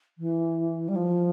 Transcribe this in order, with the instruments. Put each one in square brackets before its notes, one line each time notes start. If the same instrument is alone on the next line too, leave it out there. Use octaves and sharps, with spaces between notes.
[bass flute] E3
G3
F3